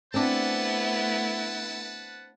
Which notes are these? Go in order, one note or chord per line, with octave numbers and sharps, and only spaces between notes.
A3 B3 C4 D4 E4 B4 F#5 A5